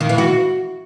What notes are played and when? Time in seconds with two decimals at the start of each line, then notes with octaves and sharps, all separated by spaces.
0.01 D#3
0.09 E3
0.18 F#4